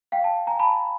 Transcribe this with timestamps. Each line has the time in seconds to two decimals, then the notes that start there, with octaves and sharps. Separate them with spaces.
0.12 F5 G5
0.24 G5 A5
0.47 G#5 A#5
0.59 A5 B5